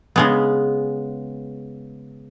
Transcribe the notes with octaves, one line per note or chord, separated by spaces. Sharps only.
C#3 G#3 B3